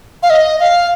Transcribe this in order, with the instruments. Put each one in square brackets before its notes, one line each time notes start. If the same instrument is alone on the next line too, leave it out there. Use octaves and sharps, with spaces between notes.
[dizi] F5
D#5
F5